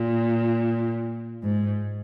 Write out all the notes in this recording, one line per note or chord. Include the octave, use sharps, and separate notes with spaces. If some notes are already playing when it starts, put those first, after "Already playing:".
Already playing: A#2
G#2